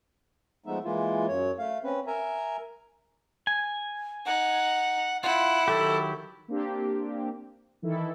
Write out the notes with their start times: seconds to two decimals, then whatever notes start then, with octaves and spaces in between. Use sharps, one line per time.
0.66 F3 G#3 A3 B3 D#4 E5
0.84 E3 G#3 A#3 E4 F4
1.28 F#2 C#5
1.59 A3 F5
1.84 C4 C#4 B4
2.07 A#4 E5 G#5 A#5
3.47 G#5
4.26 D#4 F#5
5.24 E4 F4 F#5
5.68 D#3 F#3 G4 A4
6.48 A#3 C4 D4 G4
7.82 D#3 E3 E4 A4